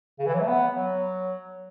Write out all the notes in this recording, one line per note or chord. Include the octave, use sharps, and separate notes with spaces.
C#3
E3
F#3
A3
B3
F#3